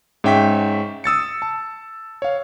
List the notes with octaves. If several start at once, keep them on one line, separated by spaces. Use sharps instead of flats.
G#2 C#4 E5 G5 C#6 B6
D#6 E6 A6 C#7
A5
C#5 F5